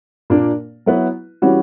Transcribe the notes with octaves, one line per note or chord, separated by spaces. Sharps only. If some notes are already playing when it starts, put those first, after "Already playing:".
A#2 A#3 D4 A#4
F#3 B3 E4 B4
E3 G3 C#4 F#4